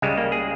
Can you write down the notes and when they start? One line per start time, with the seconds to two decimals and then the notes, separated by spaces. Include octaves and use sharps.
0.02 C#2 C#3 G3 G#3
0.17 A#3
0.32 G#4